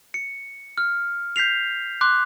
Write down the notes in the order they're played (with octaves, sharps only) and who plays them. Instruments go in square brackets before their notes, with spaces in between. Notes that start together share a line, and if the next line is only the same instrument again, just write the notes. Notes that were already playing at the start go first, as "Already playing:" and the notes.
[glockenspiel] C#7
F6
G6 B6 C7 F7
C6 D6 F#6